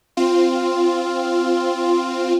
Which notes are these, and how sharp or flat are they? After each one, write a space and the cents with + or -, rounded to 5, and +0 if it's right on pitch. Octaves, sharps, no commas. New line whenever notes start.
C4 +0 F4 +0